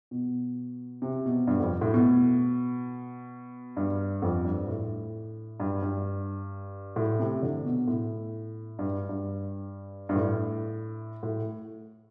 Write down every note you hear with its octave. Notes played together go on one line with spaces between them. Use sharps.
B2
C3
B2
G2
F2
A2
B2
G2
F2
G2
A2
G2
G2
A2
C3
D3
B2
A2
G2
G2
G2
A2
A2